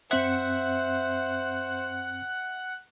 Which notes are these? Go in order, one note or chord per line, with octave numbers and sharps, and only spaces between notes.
F#2 C4 C5 E5 F#5 F#6